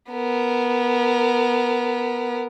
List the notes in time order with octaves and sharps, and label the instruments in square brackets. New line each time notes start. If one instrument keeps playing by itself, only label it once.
[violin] B3 A#4